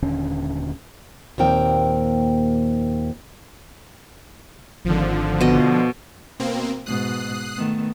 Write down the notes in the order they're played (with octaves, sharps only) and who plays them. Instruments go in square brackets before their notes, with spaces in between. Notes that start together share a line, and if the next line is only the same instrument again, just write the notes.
[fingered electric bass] D#1 D#2 D3 C#4
[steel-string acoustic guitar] D#2 A#2 C4 A#4 G5
[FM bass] G#1 [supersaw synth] D3 F3
[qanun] B2 D#5 [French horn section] B3
[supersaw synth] B2 A#3 C4
[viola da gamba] G#2 B2 [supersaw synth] D#6 F#6 C7
[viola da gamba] D#3 A3 B3